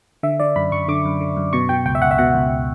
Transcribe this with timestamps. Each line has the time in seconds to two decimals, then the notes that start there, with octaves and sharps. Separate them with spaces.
0.23 D3 E5
0.40 D3 D5
0.56 F#2 B5
0.72 F#2 C#6
0.88 D3 D6
1.05 F#2
1.21 D3
1.37 F#2
1.53 B2 C#6
1.69 B2 G5
1.85 C#2 G5
1.95 E5
2.02 C#2 F#5
2.11 E5
2.18 B2 F#5
2.34 C#2